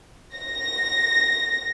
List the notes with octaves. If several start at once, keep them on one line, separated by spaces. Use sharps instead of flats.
A#6